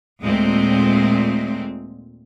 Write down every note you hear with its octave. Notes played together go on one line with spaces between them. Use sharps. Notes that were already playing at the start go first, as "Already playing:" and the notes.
D#2 A#2 G#3 A3 C4